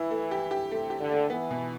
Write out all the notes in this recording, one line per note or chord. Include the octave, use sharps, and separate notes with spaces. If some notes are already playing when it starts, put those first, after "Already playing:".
Already playing: E3 E4
A3
G4
G4
C3 A3
G4
D3
A3
E3 B3
B2